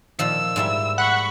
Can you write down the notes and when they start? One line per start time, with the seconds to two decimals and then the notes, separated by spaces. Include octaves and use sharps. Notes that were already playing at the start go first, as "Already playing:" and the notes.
0.19 A#2 D#3 F3 E6
0.56 G#2 G3 E4
0.98 F#5 B5 C#6